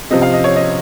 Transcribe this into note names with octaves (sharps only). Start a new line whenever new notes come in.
C3 F3 D#5
F5
D#5
C#5
D#5